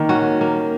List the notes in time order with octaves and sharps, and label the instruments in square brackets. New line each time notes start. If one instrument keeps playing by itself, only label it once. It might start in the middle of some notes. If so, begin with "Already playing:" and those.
Already playing: [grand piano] D#3 [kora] A#3
[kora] C#4 F#4
A#3